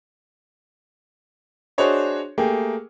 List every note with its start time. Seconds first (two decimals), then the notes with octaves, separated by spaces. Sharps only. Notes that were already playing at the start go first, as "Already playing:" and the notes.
1.78 D4 F#4 G#4 C5 C#5 D#5
2.38 A3 A#3 G4 G#4